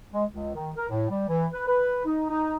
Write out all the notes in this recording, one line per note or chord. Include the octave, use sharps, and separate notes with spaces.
G#3
C#2
D#3
A#4
A2
G3
E3
B4
B4
D#4
D#4